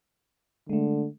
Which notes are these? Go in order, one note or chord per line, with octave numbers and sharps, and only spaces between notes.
D3 G#3 A3